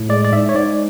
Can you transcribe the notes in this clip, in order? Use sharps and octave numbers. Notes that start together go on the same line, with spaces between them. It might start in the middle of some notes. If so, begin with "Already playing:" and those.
Already playing: A2
G#3 D5
D5
G#2 E5
C#5
G#2 D5